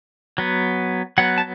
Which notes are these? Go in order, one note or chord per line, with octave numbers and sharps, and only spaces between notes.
F#3 B3
F#3 B3 F#5
A5